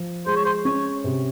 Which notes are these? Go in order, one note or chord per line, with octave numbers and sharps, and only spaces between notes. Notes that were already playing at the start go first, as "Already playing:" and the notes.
Already playing: F3
G#3 C5
C#5
C5
C#4 C#5
C3